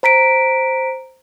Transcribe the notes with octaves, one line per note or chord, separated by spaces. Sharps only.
C5 A#5 B6 D7